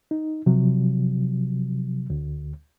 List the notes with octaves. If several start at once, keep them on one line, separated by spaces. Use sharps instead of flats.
D#4
C3 F3 F#3
D2